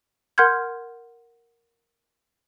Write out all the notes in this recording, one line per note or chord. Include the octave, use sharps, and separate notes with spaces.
A#4 F#5 C6 F6 G6 G#6